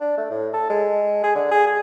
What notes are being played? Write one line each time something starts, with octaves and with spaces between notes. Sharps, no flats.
D4
A3
A2
A4
G#3
G#4
D3
G#4
G#4